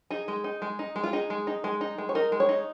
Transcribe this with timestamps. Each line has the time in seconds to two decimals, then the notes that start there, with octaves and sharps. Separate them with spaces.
0.11 D#4 G#4
0.28 G#3
0.44 D#4
0.62 G#3
0.79 D#4
0.96 G#3
1.04 F4
1.13 D#4 G#4
1.30 G#3
1.47 D#4
1.64 G#3
1.81 D#4
1.98 G#3
2.09 C#5
2.15 D#4 A#4
2.32 G#3
2.40 C#5
2.49 D#4